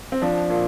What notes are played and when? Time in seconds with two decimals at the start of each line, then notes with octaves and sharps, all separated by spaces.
0.12 C4
0.22 F3 D4
0.50 A#2